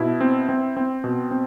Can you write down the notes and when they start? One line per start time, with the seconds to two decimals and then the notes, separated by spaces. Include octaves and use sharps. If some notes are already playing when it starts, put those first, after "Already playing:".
Already playing: B2 E4
0.20 C4
0.49 C4
0.77 C4
1.04 B2
1.31 C4